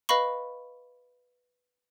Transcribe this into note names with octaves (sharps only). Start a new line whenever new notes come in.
B4 D#5 F5 B5 C#6